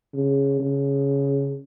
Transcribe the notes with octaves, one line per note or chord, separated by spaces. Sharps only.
C#3
C#3